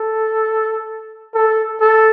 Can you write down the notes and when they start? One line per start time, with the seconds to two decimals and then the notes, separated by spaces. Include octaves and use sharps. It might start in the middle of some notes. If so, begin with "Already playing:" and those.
Already playing: A4
1.35 A4
1.81 A4